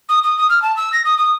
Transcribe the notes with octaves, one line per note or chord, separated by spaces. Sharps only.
D#6
D#6
D#6
F6
A5
E6
A#6
D#6
D#6